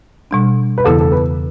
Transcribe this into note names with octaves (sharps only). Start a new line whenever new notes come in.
B2 G3 D4
B4
E2 C#3 E3 B3 E4 A4
A4
B4